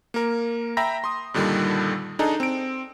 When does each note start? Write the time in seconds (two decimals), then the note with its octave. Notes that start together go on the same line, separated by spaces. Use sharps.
0.14 A#3 A#4
0.77 E5 G5 A#5 B5 A#6
1.04 C6 D#6
1.34 G2 A#2 D3 D#3 G3
2.19 D4 D#4 G#4 A4 D#5 A#5
2.40 C4 D7